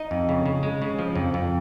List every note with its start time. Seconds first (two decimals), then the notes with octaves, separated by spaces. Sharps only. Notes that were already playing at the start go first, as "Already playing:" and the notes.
Already playing: D#4 D#5
0.11 F2
0.29 C#3
0.46 C#3
0.63 G#3
0.82 C#3
0.99 F3
1.16 F2
1.34 F2